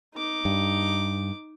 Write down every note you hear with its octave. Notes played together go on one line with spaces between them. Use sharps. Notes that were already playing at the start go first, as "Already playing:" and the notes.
D#4 D6
G2